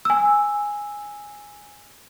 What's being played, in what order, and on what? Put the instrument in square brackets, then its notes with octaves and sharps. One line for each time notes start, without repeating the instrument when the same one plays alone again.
[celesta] G#5 E6